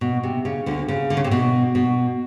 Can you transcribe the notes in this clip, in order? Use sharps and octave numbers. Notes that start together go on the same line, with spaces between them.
B2
C3
C#3
D2 D3
C#3
D3
C#3
C3
B2
B2